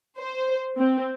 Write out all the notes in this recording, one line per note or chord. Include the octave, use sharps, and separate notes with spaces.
C5
C4